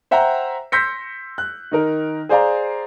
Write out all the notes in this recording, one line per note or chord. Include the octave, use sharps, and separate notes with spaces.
C5 E5 F#5 G5 A#5
C6 E6 G6 A#6 B6 C#7
F#6
D#3 D#4 A#4
G#4 C5 D5 F5 A#5